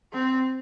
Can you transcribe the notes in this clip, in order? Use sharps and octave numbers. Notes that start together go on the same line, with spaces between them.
C4